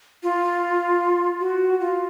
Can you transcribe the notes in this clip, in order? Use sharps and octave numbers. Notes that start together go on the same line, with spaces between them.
F4
F#4
F4